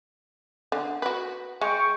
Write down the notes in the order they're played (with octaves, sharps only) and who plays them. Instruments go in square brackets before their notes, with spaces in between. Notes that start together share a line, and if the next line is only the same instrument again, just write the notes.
[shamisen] D3
F#4 B4
[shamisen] G#3 [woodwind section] G5 C#6